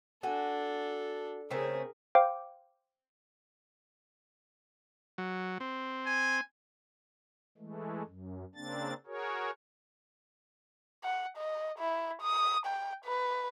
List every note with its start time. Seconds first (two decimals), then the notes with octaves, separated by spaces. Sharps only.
0.23 D4 F#4 A4 G#5
1.51 C#3 A3 C4 G#4 A#4
2.15 C5 F5 G5 D6
5.18 F#3
5.60 C4
6.06 G#5
7.58 E3 G#3 A3
8.05 F#2
8.55 C#3 A#3 C4 D4 A6
9.07 F#4 G#4 A#4 C#5
11.04 F#5
11.37 D#5
11.79 E4
12.22 D#6
12.66 G5
13.05 B4